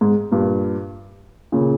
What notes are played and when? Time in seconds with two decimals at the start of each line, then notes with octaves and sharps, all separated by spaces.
0.01 G#2
0.31 G2 A#2
1.52 A#2 C#3